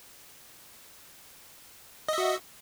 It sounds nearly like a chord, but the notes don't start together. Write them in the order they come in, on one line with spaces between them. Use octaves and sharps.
D#5 E5 F#4